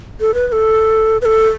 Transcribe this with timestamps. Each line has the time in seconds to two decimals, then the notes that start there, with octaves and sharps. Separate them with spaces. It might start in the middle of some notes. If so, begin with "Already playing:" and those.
0.20 A4
0.34 B4
0.48 B4
0.52 A4
1.22 B4
1.25 A4